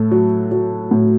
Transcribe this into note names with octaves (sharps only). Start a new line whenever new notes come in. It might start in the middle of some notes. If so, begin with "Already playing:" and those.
Already playing: A2 A4
F#3
F#3
A2